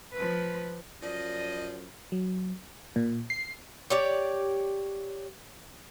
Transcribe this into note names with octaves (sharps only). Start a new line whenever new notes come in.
F3 B4
F#2 F3 D5 D#5
F#3
A#2
C7
G4 C#5 D5